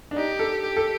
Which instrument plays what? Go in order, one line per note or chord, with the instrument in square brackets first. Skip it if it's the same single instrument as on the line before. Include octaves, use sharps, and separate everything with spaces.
[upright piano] D4
[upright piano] D#4 [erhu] G4
[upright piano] A4
[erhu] G4
[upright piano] A4